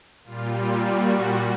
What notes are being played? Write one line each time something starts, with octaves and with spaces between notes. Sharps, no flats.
A#2 G3 F4
F4
F#4